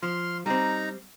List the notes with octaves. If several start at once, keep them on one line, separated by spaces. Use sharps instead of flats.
F3 C6 F6
G3 C4 D#4 A#5